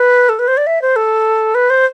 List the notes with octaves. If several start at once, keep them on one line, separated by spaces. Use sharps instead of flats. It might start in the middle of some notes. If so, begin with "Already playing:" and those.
Already playing: B4
A4
B4
C5
D5
E5
C5
A4
B4
C5